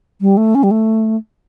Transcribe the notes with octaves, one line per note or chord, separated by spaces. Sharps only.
G3
A3
C#4
G3
A3